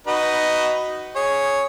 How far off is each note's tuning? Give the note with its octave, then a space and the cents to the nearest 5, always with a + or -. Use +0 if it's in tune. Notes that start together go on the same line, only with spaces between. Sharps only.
D#4 +0 F#4 +10 B4 +0
G#4 +0 C#5 +0